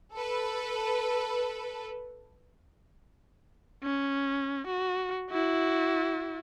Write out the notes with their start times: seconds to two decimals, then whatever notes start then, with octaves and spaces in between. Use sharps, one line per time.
0.13 A4 B4
3.83 C#4
4.67 F#4
5.30 E4 F#4